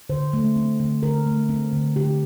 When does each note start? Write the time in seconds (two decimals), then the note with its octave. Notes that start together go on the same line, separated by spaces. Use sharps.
0.09 D3 C5
0.33 A3
0.56 C4
0.80 D3
1.03 D3 A#4
1.27 A3
1.49 C4
1.73 D3
1.96 D3 G4